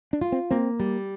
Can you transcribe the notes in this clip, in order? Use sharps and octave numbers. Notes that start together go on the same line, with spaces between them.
D4
F4
C4
A#3 C4
G3